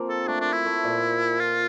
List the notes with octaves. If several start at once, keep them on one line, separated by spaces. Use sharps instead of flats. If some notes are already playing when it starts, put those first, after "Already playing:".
Already playing: F3 A#3 C4
A4
A3 D4
D4
E4
A3
A#2
F4